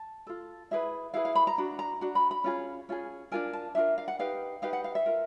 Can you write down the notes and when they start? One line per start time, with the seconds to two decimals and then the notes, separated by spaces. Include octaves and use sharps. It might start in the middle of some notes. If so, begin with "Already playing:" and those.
Already playing: A5
0.27 F4 A4
0.71 E4 G#4 B4 E5
1.14 E4 G#4 B4 F5
1.25 F5
1.35 B5
1.47 A#5
1.58 D4 F#4
1.79 A#5
2.01 D4 F#4
2.15 B5
2.31 B5
2.44 C#4 F4 G#4
2.89 C#4 F4 G#4
3.32 D4 F4 A#4 G#5
3.53 A5
3.75 D4 F4 A#4 E5
3.98 F5
4.08 F#5
4.19 D#4 G4 B4 F5
4.62 D#4 G4 B4 F5
4.73 F#5
4.84 F5
4.95 E5
5.06 F4 A#4